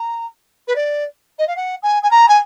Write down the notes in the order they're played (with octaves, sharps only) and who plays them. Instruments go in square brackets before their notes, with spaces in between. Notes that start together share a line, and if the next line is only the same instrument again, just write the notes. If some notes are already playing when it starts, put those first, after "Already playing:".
Already playing: [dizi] A#5
B4
D5
D#5
F5
F#5
G#5
G#5
A#5
G#5